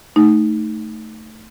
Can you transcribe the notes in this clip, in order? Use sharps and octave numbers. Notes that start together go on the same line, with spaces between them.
A3 D#4